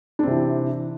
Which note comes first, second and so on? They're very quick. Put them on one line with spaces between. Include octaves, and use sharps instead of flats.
D4 C4 C3 E3